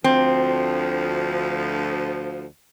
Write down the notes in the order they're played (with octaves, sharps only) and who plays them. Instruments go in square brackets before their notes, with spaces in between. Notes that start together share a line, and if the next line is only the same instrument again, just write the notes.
[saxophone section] D2 F3 [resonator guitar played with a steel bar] C4